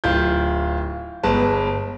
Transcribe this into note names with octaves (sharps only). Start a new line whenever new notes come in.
D1 E4 F4 G6
G1 G#3 B4 A5